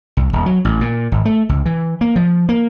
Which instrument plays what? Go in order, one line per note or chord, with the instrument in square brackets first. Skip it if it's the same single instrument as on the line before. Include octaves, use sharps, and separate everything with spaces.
[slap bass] C2
D#1
F#3
A1
A#2
G#1
A3
C#2
E3
A#3
F3
A#3